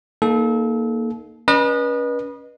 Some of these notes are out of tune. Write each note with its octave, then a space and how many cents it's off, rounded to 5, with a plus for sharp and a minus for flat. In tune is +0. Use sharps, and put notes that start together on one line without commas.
A#3 +0 D#4 +0 A4 -35
C#4 +20 B4 -30 D#5 -30